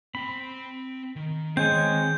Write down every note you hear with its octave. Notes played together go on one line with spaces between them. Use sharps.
C4 G5 B5
D#3
G#3 C4 C#5 G#5 G6